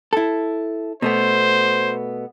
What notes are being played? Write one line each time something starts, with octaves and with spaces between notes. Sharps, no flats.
E4 A4
B2 A3 B3 C5